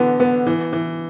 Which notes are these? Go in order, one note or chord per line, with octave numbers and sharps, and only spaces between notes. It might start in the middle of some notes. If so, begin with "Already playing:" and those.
Already playing: D3 E3 B3
B3
E3
E3